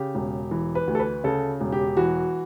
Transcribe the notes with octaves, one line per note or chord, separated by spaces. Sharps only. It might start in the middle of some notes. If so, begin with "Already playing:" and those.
Already playing: C#3 G4
E1
E3
B4
D2
A4
B4
C#3 A4
E1
G4
E3 F#4